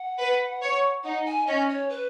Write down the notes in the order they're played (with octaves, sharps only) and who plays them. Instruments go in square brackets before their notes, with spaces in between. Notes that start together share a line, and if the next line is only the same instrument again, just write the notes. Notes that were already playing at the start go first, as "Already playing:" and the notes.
Already playing: [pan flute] F#5
[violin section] B4
C#5
[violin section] D#4 [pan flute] F#5
[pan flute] G#5
[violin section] C#4 [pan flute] D#5
[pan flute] C#5
B4